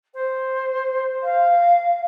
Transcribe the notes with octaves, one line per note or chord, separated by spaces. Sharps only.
C5
F5